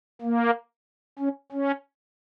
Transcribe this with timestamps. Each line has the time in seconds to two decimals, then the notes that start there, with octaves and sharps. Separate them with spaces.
0.22 A#3
1.19 C#4
1.52 C#4